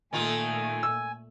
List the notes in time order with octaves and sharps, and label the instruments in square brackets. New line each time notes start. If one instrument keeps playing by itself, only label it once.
[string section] A#2 A3 [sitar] D#3 D#4 F4 [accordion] G#5
[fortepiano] E6